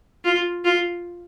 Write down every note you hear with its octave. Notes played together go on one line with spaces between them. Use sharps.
F4
F4